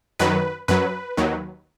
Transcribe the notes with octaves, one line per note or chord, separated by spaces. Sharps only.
F#2 D#3 F#3 B4
F#2 F#3 B4
D#2 D#3 F#3